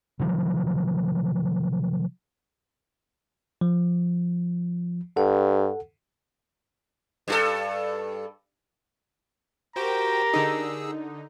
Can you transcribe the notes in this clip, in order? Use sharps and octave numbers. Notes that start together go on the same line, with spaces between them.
C3 D#3 F3 F#3
F3
G2 A4 F#5
G2 F4 A4
F#4 G4 A#4 C5 G5 A#5
D3 D#4 G#4 E6